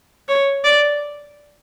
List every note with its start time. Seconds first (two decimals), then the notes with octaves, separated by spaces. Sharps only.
0.29 C#5
0.64 D5